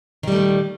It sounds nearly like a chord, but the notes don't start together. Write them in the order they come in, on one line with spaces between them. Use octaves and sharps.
D#3 G3 A3 A#2